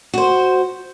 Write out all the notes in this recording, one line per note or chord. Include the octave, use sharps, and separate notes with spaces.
F#4 C5